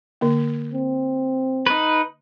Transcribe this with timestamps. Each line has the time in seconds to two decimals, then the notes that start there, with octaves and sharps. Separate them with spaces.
0.21 D3 A#3
0.73 C4
1.66 D#4 B4